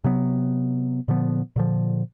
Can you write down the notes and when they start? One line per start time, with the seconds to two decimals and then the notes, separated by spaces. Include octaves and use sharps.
0.04 C3 F#3 B3
1.08 A#2 D3 F3 B3
1.56 A#2 D3 F3